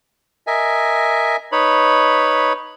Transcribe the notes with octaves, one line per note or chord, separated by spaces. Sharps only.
A#4 D#5 E5 G#5
D#4 B4 C#5 B5